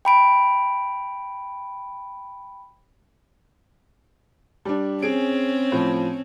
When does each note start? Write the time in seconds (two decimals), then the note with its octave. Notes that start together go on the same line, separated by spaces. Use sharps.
0.05 G5 B5 D7
4.65 G3 D4
5.02 C4 C#4 G#4 D7
5.72 A2 F3